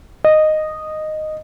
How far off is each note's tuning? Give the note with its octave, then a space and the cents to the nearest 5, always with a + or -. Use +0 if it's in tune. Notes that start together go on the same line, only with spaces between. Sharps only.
D#5 -10